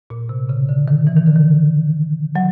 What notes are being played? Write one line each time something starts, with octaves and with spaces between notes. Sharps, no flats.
A#2
C3
C#3
D3
D#3
E3
D#3
D3
D#3
F#3